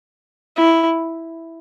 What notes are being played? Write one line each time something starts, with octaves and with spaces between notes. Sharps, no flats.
E4